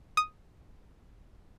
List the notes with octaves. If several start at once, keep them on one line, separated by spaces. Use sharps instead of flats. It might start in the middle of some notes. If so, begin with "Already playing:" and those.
D#6